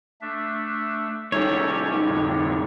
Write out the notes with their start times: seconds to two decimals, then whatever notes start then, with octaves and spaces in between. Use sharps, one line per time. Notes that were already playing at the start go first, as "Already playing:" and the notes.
0.21 A3 D4 E5
1.32 C2 D#3 C#4 G4 A4 C#5
2.04 F2 A2 D3